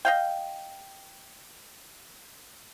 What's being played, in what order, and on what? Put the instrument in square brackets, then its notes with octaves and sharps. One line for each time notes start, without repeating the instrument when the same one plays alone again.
[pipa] D#5 F5 G5